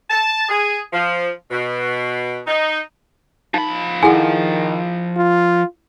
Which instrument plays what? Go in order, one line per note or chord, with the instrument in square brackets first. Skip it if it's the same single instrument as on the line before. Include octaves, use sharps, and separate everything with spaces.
[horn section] A5
G#4
F3
B2
D#4
[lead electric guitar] F3 B5 [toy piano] D#4
[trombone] D#3 [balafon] E4 F#5 [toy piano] G#4 A4 G#5
[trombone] F4